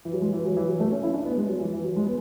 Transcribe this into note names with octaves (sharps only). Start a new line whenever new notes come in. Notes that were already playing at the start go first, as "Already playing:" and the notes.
E3
F#3
G#3
E3
F#3
E3
F#3
A3
C#4
E4
D4
B3
G#3
F#3
E3
E3
F#3
G#3
B3